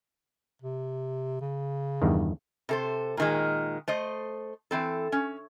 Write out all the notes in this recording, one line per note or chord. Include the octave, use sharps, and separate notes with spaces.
C3
C#3
E2 G2 D#3
C3 A4 C5
A#2 D#3 G#3
A3 C5 D#5
E3 C4 A4
C#4